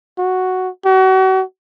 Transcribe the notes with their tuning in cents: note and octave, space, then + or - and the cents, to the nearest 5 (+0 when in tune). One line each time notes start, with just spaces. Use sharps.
F#4 +0
F#4 +35